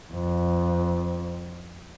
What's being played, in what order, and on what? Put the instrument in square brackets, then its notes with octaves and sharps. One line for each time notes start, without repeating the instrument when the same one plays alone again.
[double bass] F2